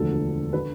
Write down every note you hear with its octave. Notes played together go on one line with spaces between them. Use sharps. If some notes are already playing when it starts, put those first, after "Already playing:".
Already playing: E1 D2 D3 F3 A4
D3 B4